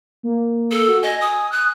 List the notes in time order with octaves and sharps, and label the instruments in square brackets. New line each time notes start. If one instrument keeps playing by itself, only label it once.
[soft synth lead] A#3
[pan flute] A4
[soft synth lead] F#4
[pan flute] D#5 [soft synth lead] G#5
[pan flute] D#6
[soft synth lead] D#6 [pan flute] F#6